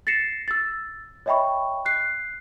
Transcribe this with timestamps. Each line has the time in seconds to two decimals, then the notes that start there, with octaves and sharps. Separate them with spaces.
0.07 A6 A#6 C7 C#7 E7
0.48 E6 A6
1.26 C#5 D#5 E5 G5 B5 C#6
1.85 F#6 C7